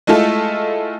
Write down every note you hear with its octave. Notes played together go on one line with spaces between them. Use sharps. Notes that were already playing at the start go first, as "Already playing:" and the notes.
G#3 A3 E4 F4 A4